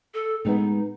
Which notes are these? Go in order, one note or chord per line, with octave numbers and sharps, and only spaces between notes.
A4
A2 G#3 B3 D#4